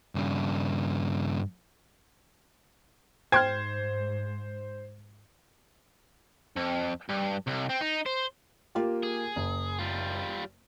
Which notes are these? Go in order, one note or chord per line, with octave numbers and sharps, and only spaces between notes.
G2 C#3
G#2 C5 G5 C6 F6 G#6
F2
G2
C2
C4
D#4
C5
A#3 F4 G4
G#4
F#1
G3 F4